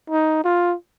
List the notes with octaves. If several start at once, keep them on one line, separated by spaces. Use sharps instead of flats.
D#4
F4